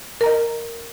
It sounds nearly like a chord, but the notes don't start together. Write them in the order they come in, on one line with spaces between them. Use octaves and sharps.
A#4 A#5 D#5